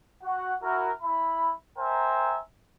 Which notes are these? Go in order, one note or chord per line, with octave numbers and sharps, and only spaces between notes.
F#4 F#5
E4 F#4 A#4
E4 B5
A#4 C5 E5 G5 G#5 A#5